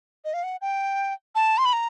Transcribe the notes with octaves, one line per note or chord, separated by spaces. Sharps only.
D#5
F5
F#5
G5
A5
C6
B5
A#5